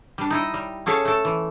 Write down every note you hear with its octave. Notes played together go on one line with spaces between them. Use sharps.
G3 D4
D#4 E4 D#5
G3
C#4 G#4 A4 C#5 E5 F5
A3 A4
E3